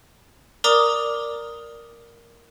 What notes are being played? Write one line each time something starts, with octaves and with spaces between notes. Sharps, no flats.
A#4 D5 A#5 D6 D#6